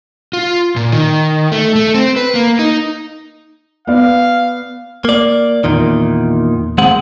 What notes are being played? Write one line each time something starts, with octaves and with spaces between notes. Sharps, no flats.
F4
A#2
D#3
A3
A3
C4
B4
A#3
D#4
B3 D5 F5
A#3 D5
E2 A#2 D#3
D#2 G#3 C4 F#5